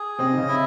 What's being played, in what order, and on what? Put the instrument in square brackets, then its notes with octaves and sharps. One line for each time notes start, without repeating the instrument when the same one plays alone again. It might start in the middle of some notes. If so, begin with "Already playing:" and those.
Already playing: [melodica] G#4
[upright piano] C3 C4 [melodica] D#5
[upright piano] D#4
C#3 C#4
[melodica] E4